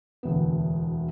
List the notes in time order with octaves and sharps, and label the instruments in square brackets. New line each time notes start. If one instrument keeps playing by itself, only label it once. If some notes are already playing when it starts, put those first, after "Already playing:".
[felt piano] E1 D2 B3